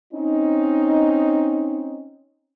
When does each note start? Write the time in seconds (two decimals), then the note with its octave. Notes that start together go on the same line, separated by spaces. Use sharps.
0.14 C4 C#4 D#4